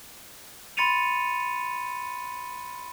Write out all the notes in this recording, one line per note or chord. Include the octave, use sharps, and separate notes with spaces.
B5 C6 A6 C#7 D#7 F7